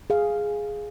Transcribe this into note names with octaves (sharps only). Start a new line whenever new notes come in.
G#4 F5